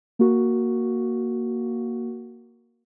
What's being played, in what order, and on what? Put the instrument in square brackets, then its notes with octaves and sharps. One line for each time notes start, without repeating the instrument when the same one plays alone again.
[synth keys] A#3 F#4